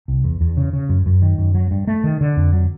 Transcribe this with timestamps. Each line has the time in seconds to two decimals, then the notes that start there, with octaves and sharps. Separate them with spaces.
0.08 C2
0.24 E2
0.41 E2
0.57 C#3
0.73 C#3
0.89 F#2
1.06 F#2
1.22 D#3
1.38 F#2
1.55 F#3
1.71 G2
1.87 A3
2.04 D#3
2.21 D3
2.37 F2
2.53 F#3